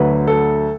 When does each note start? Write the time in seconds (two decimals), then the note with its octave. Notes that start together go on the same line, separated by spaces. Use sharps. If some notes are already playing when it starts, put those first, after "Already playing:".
Already playing: D2 D3 F#3 B4
0.27 A4